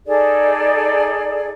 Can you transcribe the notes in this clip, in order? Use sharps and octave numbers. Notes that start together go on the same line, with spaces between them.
D#4 G#4 A4 D5